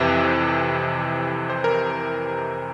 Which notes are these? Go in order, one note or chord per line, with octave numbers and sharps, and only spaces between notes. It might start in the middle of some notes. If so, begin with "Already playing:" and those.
Already playing: F2 C3 E3 E5
C5
A#4